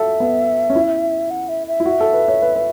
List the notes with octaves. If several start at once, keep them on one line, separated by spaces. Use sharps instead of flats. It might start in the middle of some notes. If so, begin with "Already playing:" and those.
Already playing: F#4 A4 E5
B3
C#4
E4
F#5
E5
E5
E4
F#4
A4
B4
C#5
B4
B4